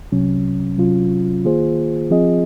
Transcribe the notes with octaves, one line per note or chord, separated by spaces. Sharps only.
C2 C3 F#3 C#4
C3 F#3 C#4 F4
D#3 A#3 F4 G#4 C5
F3 C4 F4 G#4 D#5